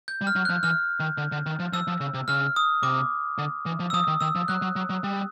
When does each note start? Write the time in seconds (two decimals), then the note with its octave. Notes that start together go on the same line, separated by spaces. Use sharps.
0.08 G6
0.21 G3
0.27 F6
0.36 F#3
0.45 F3 F#6
0.63 E3 F6
1.00 D#3
1.18 D3
1.32 D3
1.46 D#3
1.60 F3
1.73 F3 E6
1.87 F3
2.01 C#3
2.14 C3
2.28 C#3 F6
2.56 D#6
2.83 C3 D6
3.38 D3
3.66 E3
3.80 F3
3.90 E6
3.93 F3 D#6
4.08 D#3
4.21 D#3 E6
4.35 F3
4.48 F#3 F#6
4.62 F#3
4.76 F#3
4.90 F#3
5.04 G3